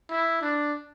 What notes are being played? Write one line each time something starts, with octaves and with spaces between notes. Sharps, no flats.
E4
D4